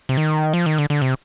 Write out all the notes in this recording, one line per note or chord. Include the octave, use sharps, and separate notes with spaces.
C3
D#3
F3
D#3
D3
D3
C3